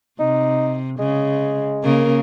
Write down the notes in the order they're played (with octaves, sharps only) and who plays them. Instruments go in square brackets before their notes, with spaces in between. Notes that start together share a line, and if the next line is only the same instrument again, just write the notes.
[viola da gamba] C3 [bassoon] D#4
[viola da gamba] C#3 [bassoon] G#3
[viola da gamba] C#3 A#3 A#4